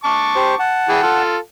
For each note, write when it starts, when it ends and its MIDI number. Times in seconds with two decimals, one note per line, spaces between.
0.04 0.55 81
0.04 0.55 85
0.04 0.55 86
0.35 0.55 67
0.35 0.55 72
0.59 1.22 78
0.59 1.22 81
0.89 1.00 52
0.89 1.00 68
0.89 1.00 79
1.03 1.37 65
1.03 1.37 69